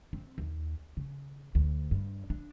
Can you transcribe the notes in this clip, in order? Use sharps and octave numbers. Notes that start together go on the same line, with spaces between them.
C4
D#2
C#3
D2
G2
D4